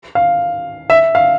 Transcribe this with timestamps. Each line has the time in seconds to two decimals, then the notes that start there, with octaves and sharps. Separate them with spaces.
0.15 F5
0.90 E5
1.15 F5